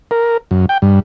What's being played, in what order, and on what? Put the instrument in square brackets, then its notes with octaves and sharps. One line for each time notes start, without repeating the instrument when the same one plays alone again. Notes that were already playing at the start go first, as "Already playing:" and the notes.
[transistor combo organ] A#4
F#2
G5
G2